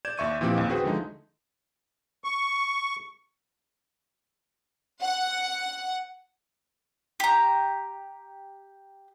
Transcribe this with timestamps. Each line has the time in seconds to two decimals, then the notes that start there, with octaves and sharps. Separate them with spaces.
0.05 D5 G6 G#6 E7
0.18 D#2 D5 E5 C#6 G#6 D#7
0.41 A#2 E3 F3 C4 G4
0.56 A1 D#2 D#5
0.70 F#4 G#4 B4 C5 F#5 G5
0.84 D3 F3 G#3 A3 D#4
2.24 C#6
5.02 F#5
7.20 G4 A#5